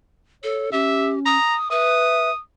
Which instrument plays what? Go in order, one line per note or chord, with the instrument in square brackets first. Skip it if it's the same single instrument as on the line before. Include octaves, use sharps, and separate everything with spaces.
[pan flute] A4 [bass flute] C#5
[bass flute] C#4 [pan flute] G4 [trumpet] E5
[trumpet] A#5 [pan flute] D#6
[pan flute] B4 [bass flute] E5 [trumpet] D#6